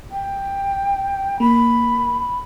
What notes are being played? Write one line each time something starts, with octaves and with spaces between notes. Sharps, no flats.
G5
A#3 B5